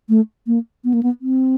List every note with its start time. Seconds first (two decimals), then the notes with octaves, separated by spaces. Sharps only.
0.09 A3
0.47 A#3
0.84 B3
0.94 A#3
1.03 B3
1.21 C4